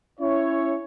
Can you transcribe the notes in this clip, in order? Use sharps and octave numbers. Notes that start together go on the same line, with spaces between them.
C#4 E4 C#5